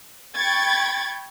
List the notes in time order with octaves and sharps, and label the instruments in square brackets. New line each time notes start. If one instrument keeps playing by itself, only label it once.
[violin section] G5 B5 C#6 G#6 A6